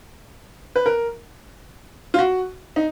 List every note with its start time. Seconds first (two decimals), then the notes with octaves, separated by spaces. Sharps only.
0.76 B4
0.86 A#4
2.14 F4
2.19 F#4
2.76 D#4